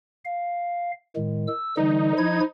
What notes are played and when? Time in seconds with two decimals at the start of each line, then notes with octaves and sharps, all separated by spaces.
0.25 F5
1.16 A2 D#3 G#3
1.48 E6
1.77 D3 E3 G3 D#4
2.18 F3 E4 G#6